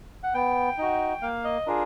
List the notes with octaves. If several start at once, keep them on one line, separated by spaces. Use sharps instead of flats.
F#5
B3 G5
D#4 F#4
A#3 F5
D#5
D4 F4 G#4 A#4